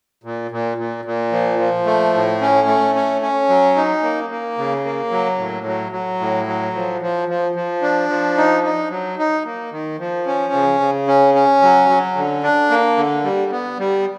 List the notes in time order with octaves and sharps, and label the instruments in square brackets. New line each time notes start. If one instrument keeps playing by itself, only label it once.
[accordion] A#2
A#2
A#2
A#2
F3
F3
A3
A2
C#4
A3
C#4
C#4
F#3
D#4
A#3
A#3
C#3
A#3
F#3
A2
F#3
F#3
A2
F#3
F3
F3
F3
F3
D4
F3
D#4
D#4
F#3
D#4
A#3
D#3
F3
C#4
C#3
C#3
C#4
C#4
F#3
F#3
D3
D4
A#3
D3
G3
B3
G3